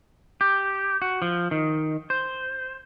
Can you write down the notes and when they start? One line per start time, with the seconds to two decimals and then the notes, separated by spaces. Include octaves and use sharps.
0.41 G4
1.02 F#4
1.22 F3
1.51 D#3
2.10 C5